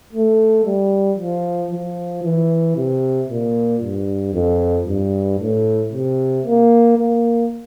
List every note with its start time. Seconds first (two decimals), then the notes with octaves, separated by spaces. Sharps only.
0.13 A3
0.65 G3
1.18 F3
1.71 F3
2.24 E3
2.76 C3
3.29 A#2
3.82 G2
4.34 F2
4.87 G2
5.39 A2
5.93 C3
6.46 A#3
6.98 A#3